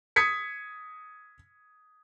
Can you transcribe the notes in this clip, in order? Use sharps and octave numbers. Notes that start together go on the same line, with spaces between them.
D#6 G#6 B6 C#7